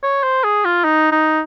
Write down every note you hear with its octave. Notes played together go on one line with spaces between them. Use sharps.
C#5
C5
G#4
F4
D#4
D#4